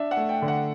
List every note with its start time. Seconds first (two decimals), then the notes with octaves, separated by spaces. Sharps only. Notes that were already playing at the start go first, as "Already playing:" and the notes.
Already playing: D4 E5
0.11 F#5
0.17 A3
0.29 G5
0.42 D3
0.48 F#5